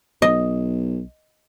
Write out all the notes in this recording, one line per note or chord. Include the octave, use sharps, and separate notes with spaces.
B1 D#5